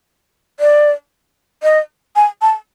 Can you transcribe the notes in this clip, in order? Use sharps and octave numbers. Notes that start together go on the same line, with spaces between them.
D5
D#5
G#5
A5